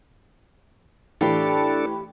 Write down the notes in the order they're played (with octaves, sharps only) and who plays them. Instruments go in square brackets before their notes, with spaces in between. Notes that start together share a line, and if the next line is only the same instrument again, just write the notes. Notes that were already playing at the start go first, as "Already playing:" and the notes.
[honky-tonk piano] A2 E3 [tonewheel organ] D4 A4 [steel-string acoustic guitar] G4 F5 [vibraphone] G5 B5